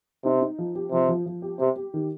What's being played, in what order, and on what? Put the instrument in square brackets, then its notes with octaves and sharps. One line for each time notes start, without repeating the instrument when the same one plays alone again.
[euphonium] C3 [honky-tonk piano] D#4
[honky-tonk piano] D#4
F3
G4
[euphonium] C3 [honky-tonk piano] F3
[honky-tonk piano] F3
F3
G4
[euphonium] C3 [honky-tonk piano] G4
[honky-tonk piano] G4
D#3